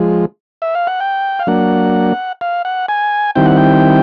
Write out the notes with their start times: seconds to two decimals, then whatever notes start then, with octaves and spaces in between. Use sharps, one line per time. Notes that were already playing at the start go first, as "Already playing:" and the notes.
Already playing: F3 G#3
0.62 E5
0.75 F5
0.87 F#5
1.00 G5
1.39 F5
1.47 F#3 A#3 D4 F#5
2.41 F5
2.65 F#5
2.89 G#5
3.35 D#3 G3 C4 E4 G5
3.46 F#5
3.57 G5